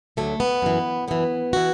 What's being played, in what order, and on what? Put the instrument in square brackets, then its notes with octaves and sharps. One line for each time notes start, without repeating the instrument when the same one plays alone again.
[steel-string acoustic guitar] D2 D3 F#3 A3
B3
F#2 E3
F#2 E3 B3
E3 F#4